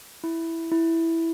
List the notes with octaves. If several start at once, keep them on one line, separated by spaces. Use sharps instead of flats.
E4
E4